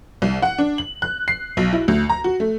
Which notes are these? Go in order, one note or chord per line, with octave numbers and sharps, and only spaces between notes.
C2
F#5
D4
F#7
F#6
C7
B1
E4
D2
A#5
F#4
A3